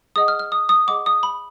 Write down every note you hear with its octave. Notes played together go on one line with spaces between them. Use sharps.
G#4 D#5 F#5 D#6
F6
F6
D#6
D#6
G#4 D#5 F#5 D6
D#6
B5